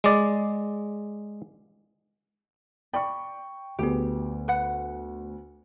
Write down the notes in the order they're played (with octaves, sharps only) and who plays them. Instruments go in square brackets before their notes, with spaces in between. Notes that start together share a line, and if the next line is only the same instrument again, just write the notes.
[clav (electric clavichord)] G#3 D5
[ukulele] D5 B5 [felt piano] G5 C#6
[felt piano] D2 B3 [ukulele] G4 G#4
[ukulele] B4 F#5